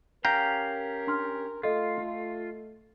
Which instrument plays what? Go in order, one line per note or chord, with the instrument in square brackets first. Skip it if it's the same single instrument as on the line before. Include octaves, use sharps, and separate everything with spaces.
[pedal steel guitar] C#4 G4 F5 [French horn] A#4 [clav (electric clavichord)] G5 A#5
[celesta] D4 C6 F6
[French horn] A3 [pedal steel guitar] F4 [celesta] A4 D#5